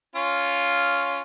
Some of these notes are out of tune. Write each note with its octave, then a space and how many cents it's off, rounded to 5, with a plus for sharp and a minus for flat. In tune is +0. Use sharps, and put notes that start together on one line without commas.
C#4 +10 F4 +0